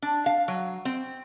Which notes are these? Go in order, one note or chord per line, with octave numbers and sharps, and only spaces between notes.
D4
F5
F#3
C4